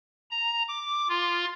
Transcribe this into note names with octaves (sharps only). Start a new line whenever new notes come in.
A#5
D6
F4